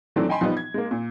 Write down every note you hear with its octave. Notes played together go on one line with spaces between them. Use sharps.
D#3 E3 F#3 A3 C4 D4
D#5 G5 G#5 B5 C6
F3 G3 B3 D#4 B4
G#6
G#3 A#3
A#2